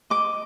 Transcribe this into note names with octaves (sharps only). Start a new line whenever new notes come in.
D#5 D6